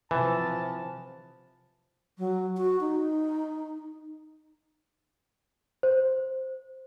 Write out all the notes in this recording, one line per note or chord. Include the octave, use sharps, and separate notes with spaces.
C3 E3 F3 A5
F#3
F#4
D#4
C5